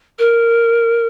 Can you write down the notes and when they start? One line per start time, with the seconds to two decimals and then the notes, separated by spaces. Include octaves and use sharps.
0.19 A#4